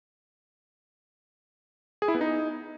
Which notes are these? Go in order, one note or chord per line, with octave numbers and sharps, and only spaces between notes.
G#4
E4
B3
D#4